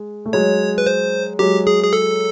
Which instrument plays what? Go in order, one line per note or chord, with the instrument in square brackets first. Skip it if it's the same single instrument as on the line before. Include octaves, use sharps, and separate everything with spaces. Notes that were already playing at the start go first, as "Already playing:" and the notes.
Already playing: [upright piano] G#3
A3
[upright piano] F#3 G#3 [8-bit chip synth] C#5
[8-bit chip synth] B4
C5
[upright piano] F#3 G#3 [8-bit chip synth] G4
[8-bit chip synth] G#4
G#4
A4